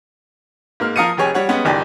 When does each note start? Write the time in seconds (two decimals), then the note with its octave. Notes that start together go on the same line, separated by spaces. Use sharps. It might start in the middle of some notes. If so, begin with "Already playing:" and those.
0.80 G#2 A#3 F6
0.96 F3 A#4 F5 D#6 C#7 D#7
1.17 F1 G4 G#4 C#5 G#5
1.35 G3 C#5 F#5
1.49 G3 G#3 B3 C#4
1.65 F#1 C#2 D#3 G4 D5 G#5